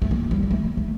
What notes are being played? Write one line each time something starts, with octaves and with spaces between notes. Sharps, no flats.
A3
A#3
G3
A#3
A3
A#3
A3